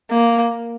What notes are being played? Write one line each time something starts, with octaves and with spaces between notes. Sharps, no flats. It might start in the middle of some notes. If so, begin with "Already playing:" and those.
A#3